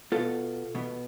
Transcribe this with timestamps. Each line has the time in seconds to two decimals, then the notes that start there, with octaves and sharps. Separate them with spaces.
0.12 B2 B3 F4 A4
0.75 B2 B3